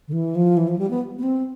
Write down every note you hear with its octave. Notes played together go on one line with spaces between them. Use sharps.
D3
E3
F3
E3
F3
G3
B3
B3
C4